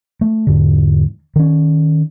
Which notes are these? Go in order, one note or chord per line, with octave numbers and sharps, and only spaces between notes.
A3
E2 G#2 D3
D#3 C#4